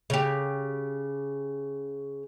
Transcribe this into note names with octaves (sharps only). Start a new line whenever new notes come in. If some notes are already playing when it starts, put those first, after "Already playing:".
C#3 G4